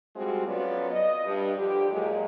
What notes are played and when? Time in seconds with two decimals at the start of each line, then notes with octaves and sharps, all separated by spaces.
0.16 F3 G3 G#3 C4 F4 F#4
0.46 F2 F#3 B3 C#4 F4 D5
0.91 D#5
1.25 G2
1.55 D3 F3 D4 G4
1.90 A#2 F#3 G#3